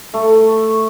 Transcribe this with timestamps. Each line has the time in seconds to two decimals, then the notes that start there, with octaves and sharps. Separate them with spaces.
0.14 A3